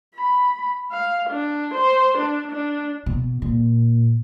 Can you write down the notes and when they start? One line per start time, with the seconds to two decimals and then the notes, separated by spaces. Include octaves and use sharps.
0.15 B5
0.91 F5
1.29 D4
1.74 C5
2.18 D4
2.51 D4
3.06 B2
3.42 A#2